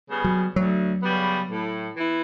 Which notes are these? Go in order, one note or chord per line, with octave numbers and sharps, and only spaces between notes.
C#3 G3 B3
F#3
D2 F#3
C#3 G3 B3
A2
E3 B3 E4